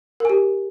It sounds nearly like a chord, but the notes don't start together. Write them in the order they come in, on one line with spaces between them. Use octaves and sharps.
A#4 G#5 G4